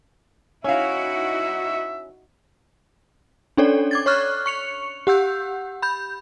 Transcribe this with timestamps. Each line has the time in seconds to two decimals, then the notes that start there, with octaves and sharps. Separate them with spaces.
0.64 C#4 D#4 E4 F#4 C#5 E5 F5
3.57 C#4 D4 A4 C#5 D5
3.91 D6 G#6 A6
4.06 C#5 C#6 F6 F#6
4.46 C#6 C#7 F7
5.07 G4 F#5 E6 G6
5.82 B5 G6